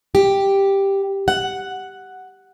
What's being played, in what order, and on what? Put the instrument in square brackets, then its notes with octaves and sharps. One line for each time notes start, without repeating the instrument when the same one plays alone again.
[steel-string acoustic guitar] G4
F#5